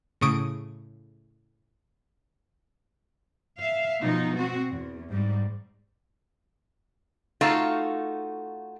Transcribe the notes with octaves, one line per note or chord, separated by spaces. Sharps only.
A2 C#3 C#6 D#6 D7
E5 F5
B2 F3 D#4
C4 F#4
E2
G#2 G3
A3 D#4 F4 F#4 A4 F5